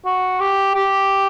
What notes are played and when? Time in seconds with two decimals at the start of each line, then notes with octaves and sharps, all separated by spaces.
0.05 F#4
0.40 G4
0.75 G4